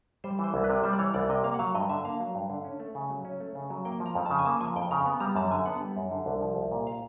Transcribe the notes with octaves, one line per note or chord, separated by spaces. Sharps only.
G3 C5
E3 C5
C2
B4
C3
G3 C5
D5
E3 C#5
C2 D5
C3 D#5
A#3 F5
F#5
F#3 F5
G2 D#5
D3 E5
A#3 F5
F#3
G2
D3
C#4
A3
C#3
F#3
C#4
A3
C#3
F#3
A#3 G5
F3
A#5
F2
A5
C#3
G#5
A#3 A5
F3 G#5
F2 G5
C#3 A#5
B3
G3 A#5
F#2 A5
D3 G#5
B3 F#5
G3
F#2
D3
C2
F3
C2
A#2
F5